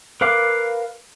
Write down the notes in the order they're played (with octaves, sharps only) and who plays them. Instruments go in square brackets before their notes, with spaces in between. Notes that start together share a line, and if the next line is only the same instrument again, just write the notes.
[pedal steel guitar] A#4 B4 F5 D6